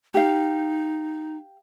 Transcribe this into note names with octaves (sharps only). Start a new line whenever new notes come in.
D#4 G4 F5